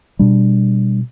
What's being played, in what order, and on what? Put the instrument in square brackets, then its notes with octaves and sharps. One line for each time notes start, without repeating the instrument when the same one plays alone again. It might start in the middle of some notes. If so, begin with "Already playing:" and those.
[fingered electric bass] B2 G3 D4